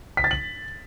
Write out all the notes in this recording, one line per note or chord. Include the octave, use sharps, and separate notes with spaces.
B6
A6
F#7